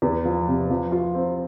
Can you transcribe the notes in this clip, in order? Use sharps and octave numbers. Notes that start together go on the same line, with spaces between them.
E2
F3
C3
F3
F4
C4